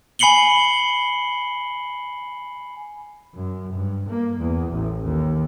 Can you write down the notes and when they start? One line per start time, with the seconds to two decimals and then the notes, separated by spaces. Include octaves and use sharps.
0.19 G#5 B5 C7 C#7 F#7 G7
3.35 F#2
3.73 G2
4.10 A#3
4.40 E2
4.72 A1
5.05 D#2